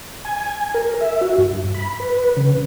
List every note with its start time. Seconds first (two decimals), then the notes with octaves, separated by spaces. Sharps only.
0.25 G#5
0.74 A#4
1.00 E5
1.21 F#4
1.38 G2
1.74 B5
2.00 B4
2.37 C#3